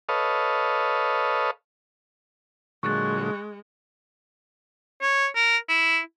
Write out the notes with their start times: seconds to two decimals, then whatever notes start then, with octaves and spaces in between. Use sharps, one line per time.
0.09 A4 B4 C#5 D#5 F5
2.83 A#2 D3 F#3 G#3 C#6 F#6 A6
5.02 C#5
5.35 A#4
5.69 E4